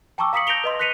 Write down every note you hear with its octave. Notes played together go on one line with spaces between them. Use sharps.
G5 A5 A#5 C#6 D6 E6
F5 A#5 D#6 B6 C#7 F#7
G6 A#6 D7 F7 G7
B4 D#5 C6
F#6 A#6 B6 C#7 D#7 F7